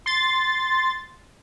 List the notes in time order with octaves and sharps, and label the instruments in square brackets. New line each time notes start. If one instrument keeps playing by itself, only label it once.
[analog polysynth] C6 A6